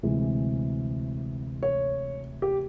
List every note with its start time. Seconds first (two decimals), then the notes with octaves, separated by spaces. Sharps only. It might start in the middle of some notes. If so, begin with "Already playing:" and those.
0.03 D2 C3 E3 G#3
1.63 C#5
2.42 G4